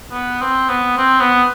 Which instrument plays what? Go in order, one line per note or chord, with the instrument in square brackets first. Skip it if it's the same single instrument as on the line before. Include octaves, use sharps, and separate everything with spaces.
[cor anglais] B3
C4
B3
C4
B3